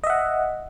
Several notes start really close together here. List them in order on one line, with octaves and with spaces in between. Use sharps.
D#5 E5 F#5